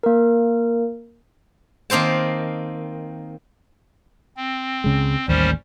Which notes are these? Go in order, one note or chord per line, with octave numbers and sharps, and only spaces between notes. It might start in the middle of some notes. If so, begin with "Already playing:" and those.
A#3 A#4
D#3 A#3 C4 C5 A5
C4
C#2 C#3 G#3
A1 D#2 G3 C#4 C5